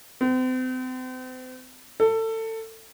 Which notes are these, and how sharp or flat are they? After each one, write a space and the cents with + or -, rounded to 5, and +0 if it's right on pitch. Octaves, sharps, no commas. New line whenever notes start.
C4 -40
A4 +25